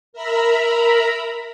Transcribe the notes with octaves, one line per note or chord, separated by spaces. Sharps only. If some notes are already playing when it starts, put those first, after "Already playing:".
A#4 E5 A#5 B5